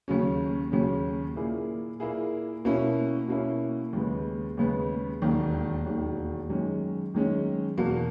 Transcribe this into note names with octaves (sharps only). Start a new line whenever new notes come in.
D#2 C#3 F#3 C#4
D#2 C#3 F#3 C#4
A#2 A#3 E4 G#4
A#2 A#3 E4 G#4
B2 A#3 C#4 E4
B2 A#3 C#4 E4
D#2 C#3 G#3 B3
D#2 C#3 G#3 B3
E1 D#2 D#3
E1 D#2 D#3
F#2 D#3 G#3 C#4
F#2 D#3 G#3 C#4
E2 B2 A#3